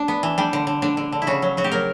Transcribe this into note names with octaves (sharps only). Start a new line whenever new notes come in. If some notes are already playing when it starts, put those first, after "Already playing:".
Already playing: D4
B3
E3
G3 D4
D3
D3
D3 D4
D3
D3
E4
C#3 F#4
F#3
F#3 F#4
G4
F#3 A#4